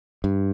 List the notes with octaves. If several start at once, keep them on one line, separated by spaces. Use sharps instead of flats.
G2